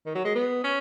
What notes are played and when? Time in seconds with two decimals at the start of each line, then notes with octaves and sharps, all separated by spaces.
0.06 D#3
0.15 F#3
0.25 G#3
0.35 B3
0.64 C#4